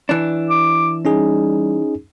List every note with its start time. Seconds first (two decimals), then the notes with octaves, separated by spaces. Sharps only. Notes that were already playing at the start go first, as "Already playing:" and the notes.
0.09 E3 D4
0.50 D6
1.05 G3 C#4 D#4 G#4